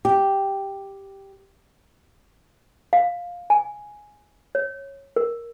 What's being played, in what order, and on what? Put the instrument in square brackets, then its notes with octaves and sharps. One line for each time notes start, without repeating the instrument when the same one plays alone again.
[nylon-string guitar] G4
[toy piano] F5
G#5
C#5
A#4